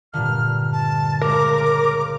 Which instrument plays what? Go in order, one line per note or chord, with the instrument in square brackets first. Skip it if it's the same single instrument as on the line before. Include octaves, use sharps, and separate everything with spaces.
[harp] G2 A#2 D3 [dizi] F6
[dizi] A5
[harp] C#2 [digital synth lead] A#4 [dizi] D6